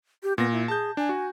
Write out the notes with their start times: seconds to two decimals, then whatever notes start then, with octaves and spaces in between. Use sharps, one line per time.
0.23 G4
0.38 A#2 B3 A#6
0.52 E4
0.68 G#4 A5 G6
0.97 D4 G#5
1.09 F#4